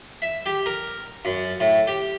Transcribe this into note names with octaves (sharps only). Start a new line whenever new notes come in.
E5
G4
A#4
F#2
A2
G4